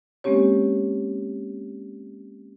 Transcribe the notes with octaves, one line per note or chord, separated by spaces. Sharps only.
G#3 A#3 C4 C#4 G4 C#5